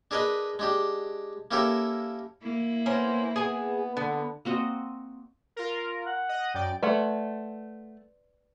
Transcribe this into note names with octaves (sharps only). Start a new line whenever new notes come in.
D4 G#4 A#4 B4 D#5 B5
G#3 D4 G4
A#3 C#4 E4 G4 A4 A#4
A#3 E4
B3 C#4 A#4 C5
B3 G#4 G#5
D3 B3
A#3 C4 F#4 D#5
F4 A#4
F#5
D#5 D#6
F#2 D5 G5 D7
A3 B4 D5 F#5 C6